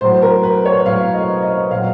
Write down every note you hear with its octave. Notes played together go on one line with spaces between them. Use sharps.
A2 F#3 C5
A#4
B4
C#5
A2 F#3 F5
D#5
D#5
A#2 F#3 F5